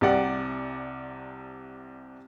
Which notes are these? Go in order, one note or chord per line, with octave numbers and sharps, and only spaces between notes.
C2 C3 G4 D5 F#5